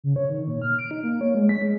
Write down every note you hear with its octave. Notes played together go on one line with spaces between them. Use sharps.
C#3
C#5
D#3
A#2
F6
D7
D#4
A#3
C#5
G#3
B6
G#3